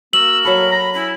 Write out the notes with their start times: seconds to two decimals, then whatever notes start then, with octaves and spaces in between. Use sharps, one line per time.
0.13 A#3 F#4 A#4 E6 F#7
0.45 F#3 A4 B5
0.71 A#5
0.94 C#4 E4 B5